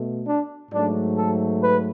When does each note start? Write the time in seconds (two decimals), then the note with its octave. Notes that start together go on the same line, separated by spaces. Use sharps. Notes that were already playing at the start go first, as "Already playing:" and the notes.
Already playing: B2 A3
0.25 D4
0.71 G#2 F#3 A3 D4
1.16 A4
1.62 B4